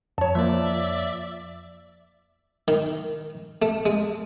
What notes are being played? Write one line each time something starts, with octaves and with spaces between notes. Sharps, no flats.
F2 C#5 A5
F3 A#3 D5 E5
D#3
A3
G#3